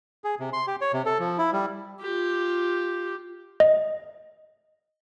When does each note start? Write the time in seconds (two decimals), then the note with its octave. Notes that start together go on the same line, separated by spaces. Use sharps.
0.24 G#4
0.40 C3
0.53 C6
0.67 G4
0.81 C#5
0.93 C3
1.06 A4
1.19 F3
1.38 E4
1.52 G3
2.01 F4 G4
3.60 D#5